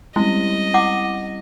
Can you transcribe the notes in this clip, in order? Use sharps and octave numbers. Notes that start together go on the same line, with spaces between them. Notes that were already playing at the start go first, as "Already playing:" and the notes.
G3 G#3 C4 C#4 E4 D#5
E4 F#5 D6